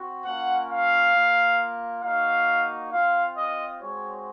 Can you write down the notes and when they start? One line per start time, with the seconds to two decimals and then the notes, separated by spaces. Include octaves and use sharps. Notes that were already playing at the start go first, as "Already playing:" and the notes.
Already playing: C4 F#4
0.26 A#3 C#4 F4 F#5
0.70 F5
1.15 A#3 F4
2.03 A#3 D#4 F#4 F5
2.93 C4 F4 F5
3.37 D#5
3.80 G#3 C4 F#4 C#5